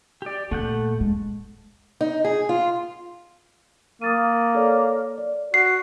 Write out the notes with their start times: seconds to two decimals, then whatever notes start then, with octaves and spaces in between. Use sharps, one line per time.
0.22 G4 D5
0.51 A#2 A3 F#5 G6
1.01 G#3
2.01 D#4
2.25 G#4
2.49 F4
4.02 A#3 D#6 A6 D#7
4.54 A4 C#5 D5
5.18 D5
5.54 F#4 C7